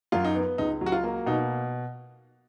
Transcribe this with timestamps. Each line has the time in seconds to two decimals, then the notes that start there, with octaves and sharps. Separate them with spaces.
0.12 F#2 F4
0.25 D#4
0.35 B3
0.58 C#2 D#4
0.81 F#3
0.86 F#4
0.92 F4
1.04 A#3
1.26 B2 D#4